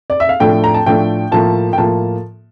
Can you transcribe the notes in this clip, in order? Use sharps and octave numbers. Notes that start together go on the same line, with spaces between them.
D5
E5
F5
A2 F3 A3 D4 G5
A#5
A5
A2 F3 A3 D4 G5
A2 F3 A#3 F4 A5
G5
A2 F3 A#3 F4 A5